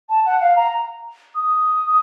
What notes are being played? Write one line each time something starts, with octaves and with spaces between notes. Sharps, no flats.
A5
F#5
F5
A#5
D#6